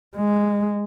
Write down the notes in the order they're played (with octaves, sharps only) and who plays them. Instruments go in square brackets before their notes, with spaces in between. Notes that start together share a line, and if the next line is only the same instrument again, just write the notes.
[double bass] G#3